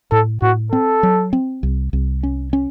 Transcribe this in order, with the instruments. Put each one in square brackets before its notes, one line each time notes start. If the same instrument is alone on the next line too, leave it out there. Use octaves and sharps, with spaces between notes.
[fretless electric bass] A2 [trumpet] A4
[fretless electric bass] A2 [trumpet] F#4
[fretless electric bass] C4 [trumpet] A4
[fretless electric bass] F#3
C4
C2
C2
C#4
C#4